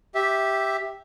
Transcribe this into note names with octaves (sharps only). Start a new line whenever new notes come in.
G4 E5